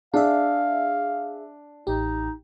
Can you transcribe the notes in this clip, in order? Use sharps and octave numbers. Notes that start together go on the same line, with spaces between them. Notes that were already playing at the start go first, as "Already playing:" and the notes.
D4 G#4 E5 F5
A1 D#4 G4